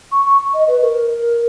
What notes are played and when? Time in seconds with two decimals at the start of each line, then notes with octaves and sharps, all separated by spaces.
0.12 C#6
0.25 C#6
0.54 D#5
0.68 B4
0.82 A#4